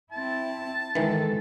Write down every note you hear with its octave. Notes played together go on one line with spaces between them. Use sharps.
C4 E4 A5
D#3 E3 G#3 A4